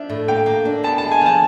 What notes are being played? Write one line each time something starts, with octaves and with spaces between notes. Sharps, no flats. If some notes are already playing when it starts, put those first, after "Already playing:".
Already playing: F3 D4 E5
A2
A#3 G5
A#3
D4
B3 A5
A5
G#3
G#5
F3 A5